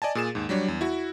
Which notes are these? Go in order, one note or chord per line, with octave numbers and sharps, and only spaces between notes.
D5 D#5 G#5 A5
A#2 G#4 E7
D#2 G#2
F#3 G3 D4 C#5
E2
E4 F#4